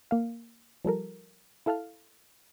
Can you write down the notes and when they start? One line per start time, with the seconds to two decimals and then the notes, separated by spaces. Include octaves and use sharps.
0.11 A#3 F5
0.85 F3 G3 A4 A#4
1.66 E4 A4 F5 A5 F6